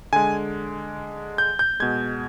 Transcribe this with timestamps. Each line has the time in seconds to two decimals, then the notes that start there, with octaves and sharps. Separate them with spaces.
0.13 D3 G#3 G#5
1.38 G6
1.59 G6
1.80 B2 G#3 G#6